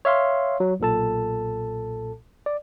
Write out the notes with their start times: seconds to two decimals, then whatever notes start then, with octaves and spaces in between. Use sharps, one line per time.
0.05 C#5 E5 F5 C6
0.60 F#3
0.80 B1 A#2 A4 A5
2.46 D5